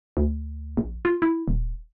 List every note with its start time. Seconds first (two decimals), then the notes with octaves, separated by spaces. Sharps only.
0.17 D2
0.77 A#1
1.05 F4
1.22 E4
1.48 D#1